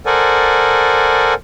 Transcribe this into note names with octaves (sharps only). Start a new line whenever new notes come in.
A4 A#4 C5 D5 F#5 G#5